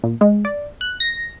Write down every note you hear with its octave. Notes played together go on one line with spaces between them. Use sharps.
A#2
G#3
D5
F#6
A#6